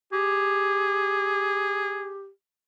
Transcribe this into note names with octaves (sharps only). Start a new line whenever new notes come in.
G4 G#4